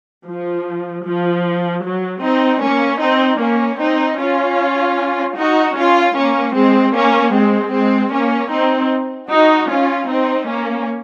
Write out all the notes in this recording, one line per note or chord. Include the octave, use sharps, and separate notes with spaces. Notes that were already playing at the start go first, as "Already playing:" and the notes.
F3
F3
F#3
C4 D#4
A#3 C#4
C4 D#4
A#3 C#4
C4 D#4
C#4 F4
D#4 F#4
C#4 F4
A#3 C#4
G#3 C4
A#3 C#4
G#3 C4
G#3 C4
A#3 C#4
C4 D#4
D#4 F#4
C#4 F4
C4 D#4
A#3 C#4